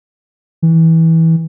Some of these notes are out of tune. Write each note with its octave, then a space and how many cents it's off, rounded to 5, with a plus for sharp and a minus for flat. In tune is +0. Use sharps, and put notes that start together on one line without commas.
E3 -20